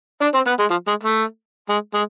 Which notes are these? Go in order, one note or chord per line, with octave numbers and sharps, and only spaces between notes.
D4
C4
B3
G#3
F3
G#3
A3
G#3
G#3